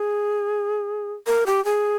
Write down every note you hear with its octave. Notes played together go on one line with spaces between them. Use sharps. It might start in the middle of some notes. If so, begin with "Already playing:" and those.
Already playing: G#4
A#4
G4
G#4